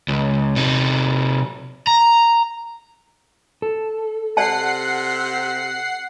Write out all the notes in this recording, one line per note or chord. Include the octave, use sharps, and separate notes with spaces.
C#2
C3 D#4
A#5
A4
C3 D5 F#5 A5 C7